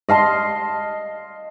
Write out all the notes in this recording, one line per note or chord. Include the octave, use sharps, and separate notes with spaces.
D#5 F5 A5 C6